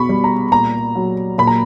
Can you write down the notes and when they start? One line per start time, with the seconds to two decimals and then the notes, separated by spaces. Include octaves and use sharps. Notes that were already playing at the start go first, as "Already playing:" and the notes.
Already playing: B2 B5 C#6
0.09 G3
0.24 A#5
0.52 A#2 A#5
0.95 F#3
1.38 A#2 B5
1.47 A#5